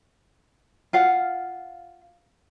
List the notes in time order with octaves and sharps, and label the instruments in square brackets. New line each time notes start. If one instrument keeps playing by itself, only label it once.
[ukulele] F4 F5 F#5